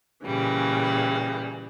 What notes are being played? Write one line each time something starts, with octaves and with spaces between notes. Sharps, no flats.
A#2 C#3 E3 G3